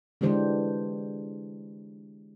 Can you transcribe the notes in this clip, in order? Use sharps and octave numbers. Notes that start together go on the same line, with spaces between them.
D3 E3 G#3 D4 G4 C5